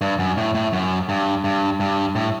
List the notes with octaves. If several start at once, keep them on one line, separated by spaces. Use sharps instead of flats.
G2
F#2
A2
A2
F#2
G2
G2
G2
A2